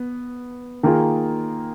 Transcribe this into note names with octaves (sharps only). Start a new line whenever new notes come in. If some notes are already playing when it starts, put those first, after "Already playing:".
Already playing: B3
D#3 A#3 F4 G#4